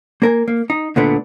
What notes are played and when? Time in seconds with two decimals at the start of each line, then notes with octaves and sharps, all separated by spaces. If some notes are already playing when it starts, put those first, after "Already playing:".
0.22 A#3 A#4 G#5
0.48 A#3
0.70 D#4
0.96 D2 A#2 D3 A3 B3 D4